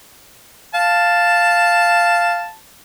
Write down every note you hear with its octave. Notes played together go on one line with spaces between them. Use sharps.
F5 A5